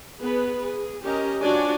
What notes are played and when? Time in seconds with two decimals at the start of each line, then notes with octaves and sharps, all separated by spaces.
0.21 B3 G#4 B4
0.63 G#4
1.04 C#4 G4 A#4 D#5
1.42 F3 D4 F#4 C#5 D5 G#5